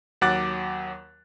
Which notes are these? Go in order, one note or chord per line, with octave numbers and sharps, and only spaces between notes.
D#2 F#3 F#5 D6 F#6 A6